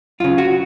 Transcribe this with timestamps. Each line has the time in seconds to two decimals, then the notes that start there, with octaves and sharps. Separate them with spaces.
0.20 F#2 C#3 F4
0.38 F#4